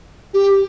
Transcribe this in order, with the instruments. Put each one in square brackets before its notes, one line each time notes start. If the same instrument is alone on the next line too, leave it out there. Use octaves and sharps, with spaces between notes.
[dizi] G4